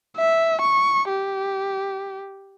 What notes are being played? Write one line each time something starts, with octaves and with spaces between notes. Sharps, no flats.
E5
C#6
G4